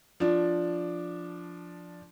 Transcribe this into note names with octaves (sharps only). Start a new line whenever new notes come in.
F3 D4